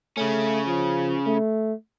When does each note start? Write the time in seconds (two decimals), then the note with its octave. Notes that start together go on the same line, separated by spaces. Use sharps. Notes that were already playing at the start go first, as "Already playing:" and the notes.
0.17 C#3 A3 C#4
0.67 F3
1.26 A3